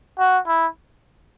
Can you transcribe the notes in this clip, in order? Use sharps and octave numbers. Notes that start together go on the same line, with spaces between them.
F#4
E4